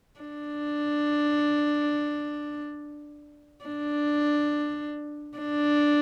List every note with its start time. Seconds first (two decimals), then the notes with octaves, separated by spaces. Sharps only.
0.20 D4
3.65 D4
5.38 D4